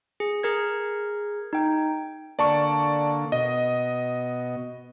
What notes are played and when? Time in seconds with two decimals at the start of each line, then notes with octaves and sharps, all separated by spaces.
0.20 G#4
0.43 G#4 A#4 G#6
1.53 D#4 G5
2.39 D3 A#3 D5 A5 C#6
3.32 B2 D#5